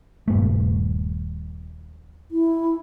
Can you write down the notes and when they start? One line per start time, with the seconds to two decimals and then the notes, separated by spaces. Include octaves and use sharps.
0.28 D#1 G2 A3
2.31 E4